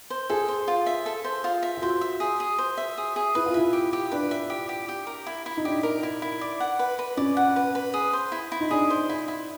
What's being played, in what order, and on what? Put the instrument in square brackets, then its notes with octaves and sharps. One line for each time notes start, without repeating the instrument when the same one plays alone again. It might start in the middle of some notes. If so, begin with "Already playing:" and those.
[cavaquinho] C5
[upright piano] G#4 [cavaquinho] A4
[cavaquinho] C5
F4
E5
A4
C5
F4
E5
[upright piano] F4
[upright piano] F#4 [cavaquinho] C5
[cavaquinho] E5
G#4
G#4
C5
E5
G#4
G#4
[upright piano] E4 [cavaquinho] B4
[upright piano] F4
[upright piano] E4 [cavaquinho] E5
[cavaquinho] G4
G4
[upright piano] D4 [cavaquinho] B4
[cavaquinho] E5
G4
G4
G4
A#4
E4
E4
[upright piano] D#4
[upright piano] D4 [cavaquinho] G4
[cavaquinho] A#4
E4
E4
D5
F#5
B4
B4
[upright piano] C#4 [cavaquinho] D5
[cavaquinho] F#5
B4
B4
G#4
C5
E4
E4
[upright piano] D#4
[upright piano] D4 [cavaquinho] G#4
[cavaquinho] C5
E4
E4